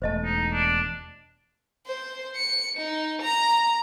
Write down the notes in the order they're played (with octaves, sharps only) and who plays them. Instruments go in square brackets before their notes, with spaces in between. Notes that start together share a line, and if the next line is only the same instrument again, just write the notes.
[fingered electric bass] E1 A3 [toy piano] C5 D#5 A5
[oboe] D#4
D4
[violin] C5
C#7
D#4
A#5